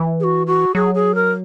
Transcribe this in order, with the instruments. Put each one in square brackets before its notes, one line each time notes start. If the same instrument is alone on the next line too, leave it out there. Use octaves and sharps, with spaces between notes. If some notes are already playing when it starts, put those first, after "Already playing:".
Already playing: [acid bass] E3
[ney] G#4
F#4
F#4
[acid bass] F#3 [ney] G#4
[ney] G#4
A#4